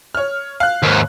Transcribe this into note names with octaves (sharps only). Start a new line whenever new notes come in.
C#5 F6
F5 F#6
D#2 G#2